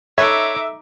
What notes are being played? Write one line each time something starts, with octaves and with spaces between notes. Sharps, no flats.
D#4 A4 B4 C#5 E5 D6